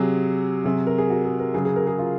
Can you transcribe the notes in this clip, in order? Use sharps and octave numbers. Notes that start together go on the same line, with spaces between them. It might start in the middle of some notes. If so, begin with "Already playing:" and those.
Already playing: C3 F#3 G#4
C3 F#3 G#4
A#4
G#4
F#4
G#4
A#4
C#3 F#3 G#4
G#4
A#4
G#4
F4